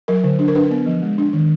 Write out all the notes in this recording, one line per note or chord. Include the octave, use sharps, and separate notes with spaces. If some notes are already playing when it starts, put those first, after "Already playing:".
F#3 A#4
D3
D4
A#4
D4 B4
B3
F3
G#3
D4
D#3